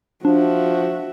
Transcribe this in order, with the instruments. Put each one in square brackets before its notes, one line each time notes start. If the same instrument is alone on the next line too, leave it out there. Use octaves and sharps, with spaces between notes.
[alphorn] F3 [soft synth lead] D4 [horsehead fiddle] F#4 E5